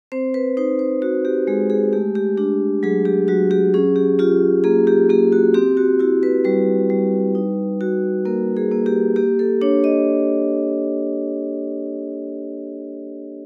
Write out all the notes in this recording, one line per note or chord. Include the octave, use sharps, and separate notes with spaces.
C4 C5
B4
D#4 C5
C5
F#4
G4
G#3 G#4
G#4
A3 G4
G4
D4 G4
F#3 G#4
G4
F#3 F#4
G4
C#4 G#4
G4
F4 G4
A#3 G#4
G4
A#3 G4
F#4
C4 G4
F#4
E4 F#4
B4
G3 B4
G3
D#4
F#4
A#3 A#4
G#4
A#3
G4
A#3 G4
A4
D4 C#5
D#5